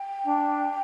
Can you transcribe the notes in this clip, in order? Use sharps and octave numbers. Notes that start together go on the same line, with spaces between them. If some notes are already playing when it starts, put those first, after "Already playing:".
Already playing: G5
D4